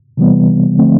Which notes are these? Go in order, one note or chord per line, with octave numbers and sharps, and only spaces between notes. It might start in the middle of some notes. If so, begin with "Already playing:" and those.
C3 E3 G3 B3
D3 F3 A3 C4